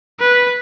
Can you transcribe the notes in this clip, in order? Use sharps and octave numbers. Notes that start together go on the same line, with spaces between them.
B4